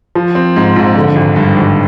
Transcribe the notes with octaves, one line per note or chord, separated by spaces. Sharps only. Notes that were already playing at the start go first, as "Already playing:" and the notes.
F3
C4
G#2
A#1
D3
G#1
G2
G#1